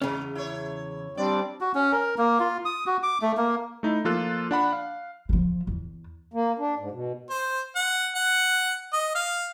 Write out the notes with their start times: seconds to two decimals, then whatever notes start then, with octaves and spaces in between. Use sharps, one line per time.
0.02 E2 C#3 G#3 C#4
0.35 E4 C#5
1.17 G3 C4 D4 D5
1.61 F#4
1.75 C#4
1.92 A#4
2.18 A#3
2.40 F4
2.65 D#6
2.87 F#4
3.03 D6
3.22 A3
3.37 A#3
3.83 A3 D#4 E4
4.05 F3 A#3 F4 A4 F#6
4.51 D4 F#5 B5
4.73 F5
5.29 E3 F3
5.67 E2
6.34 A#3
6.59 D4
6.78 G#2
6.91 B2
7.30 C5
7.75 F#5
8.15 F#5
8.93 D#5
9.15 F5